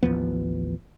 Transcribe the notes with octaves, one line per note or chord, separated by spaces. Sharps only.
A1 D#2 F3 B3